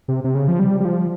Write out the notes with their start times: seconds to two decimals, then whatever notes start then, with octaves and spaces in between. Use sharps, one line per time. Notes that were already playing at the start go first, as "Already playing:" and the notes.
0.08 C3
0.24 C3
0.35 C#3
0.48 F3
0.59 G3
0.80 G3
0.85 F3